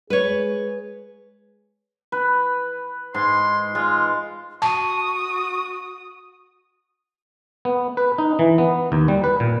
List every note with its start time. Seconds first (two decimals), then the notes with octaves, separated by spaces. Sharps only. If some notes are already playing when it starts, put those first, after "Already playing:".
0.10 G#3 G#4 B4 C#5
2.12 B4
3.14 G#2 C6
3.75 G#3 F4
4.62 F#4 A5 C#6 D#6
7.65 B3
7.97 B4
8.18 D#4
8.39 E3
8.58 B3
8.92 D#2
9.08 G3
9.24 B4
9.40 A#2